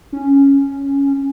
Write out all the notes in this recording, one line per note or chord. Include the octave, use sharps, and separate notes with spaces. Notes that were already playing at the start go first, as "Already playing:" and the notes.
C#4